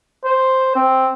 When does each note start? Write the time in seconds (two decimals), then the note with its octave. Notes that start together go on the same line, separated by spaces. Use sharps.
0.25 C5
0.75 C4